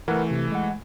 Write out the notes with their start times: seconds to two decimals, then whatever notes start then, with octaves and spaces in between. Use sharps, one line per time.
0.08 E3 A3 A#4 B4 F#5
0.31 C3
0.52 G#3 F#5